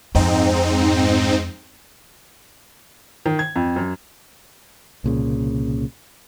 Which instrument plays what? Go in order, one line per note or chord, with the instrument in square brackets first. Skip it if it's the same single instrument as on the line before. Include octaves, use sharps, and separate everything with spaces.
[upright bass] F2 [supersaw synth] G#2 C4 D#4
[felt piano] D#3
G#6
F2
F#2
[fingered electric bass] C2 A#2 C#3